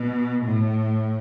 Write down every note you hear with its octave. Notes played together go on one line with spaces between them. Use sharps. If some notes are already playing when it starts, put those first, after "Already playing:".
Already playing: B2
A2